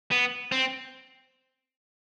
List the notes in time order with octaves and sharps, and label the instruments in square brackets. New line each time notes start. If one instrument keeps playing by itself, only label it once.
[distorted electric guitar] B3
C4